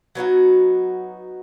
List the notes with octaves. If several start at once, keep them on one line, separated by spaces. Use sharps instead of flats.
F#3 B3 D#4 F#4